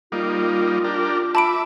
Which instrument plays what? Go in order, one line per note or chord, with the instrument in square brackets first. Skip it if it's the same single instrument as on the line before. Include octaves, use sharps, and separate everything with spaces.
[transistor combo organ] G3 A#3 D#4 [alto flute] F4
[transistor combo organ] D4 G4 A#4
[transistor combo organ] E5 D6 [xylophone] A5 B5 D7